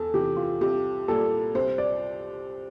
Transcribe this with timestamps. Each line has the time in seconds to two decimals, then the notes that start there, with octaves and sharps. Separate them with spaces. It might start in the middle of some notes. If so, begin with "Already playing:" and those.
Already playing: E2 A4
0.14 C3 E3 G4
0.37 F4
0.61 C2 G4
1.08 A#2 G3 A#3 A4
1.55 C2 C5
1.78 D5